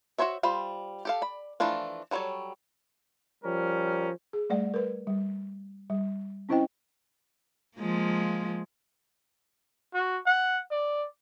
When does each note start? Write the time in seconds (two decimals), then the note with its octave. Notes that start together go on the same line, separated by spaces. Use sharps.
0.18 F#4 A4 C5 C#5 E5
0.43 G3 F4 C5 B5
1.05 G4 A4 F5
1.22 D5 B5
1.60 E3 F3 A3 D4 F4
2.11 F#3 G3 C4 A4 C#5
3.44 F3 G3 C#4 A#4
4.33 G#4
4.50 G3 A3 D5 F#5
4.74 A#4 B4
5.07 G3
5.90 G3
6.49 C4 C#4 E4 C5 D#5 G5
7.77 F3 G#3 A#3
9.94 F#4
10.26 F#5
10.71 D5